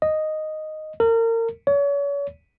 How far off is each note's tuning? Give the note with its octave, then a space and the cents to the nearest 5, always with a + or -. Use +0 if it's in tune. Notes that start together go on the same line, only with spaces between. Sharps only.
D#5 -5
A#4 -30
C#5 +35